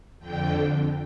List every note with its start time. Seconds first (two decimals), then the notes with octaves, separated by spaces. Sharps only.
0.19 F2 D3 G5